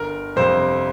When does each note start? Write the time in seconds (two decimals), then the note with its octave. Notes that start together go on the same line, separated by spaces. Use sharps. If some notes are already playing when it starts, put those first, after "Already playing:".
Already playing: G1 A#4
0.36 F2 C3 G3 A#3 C5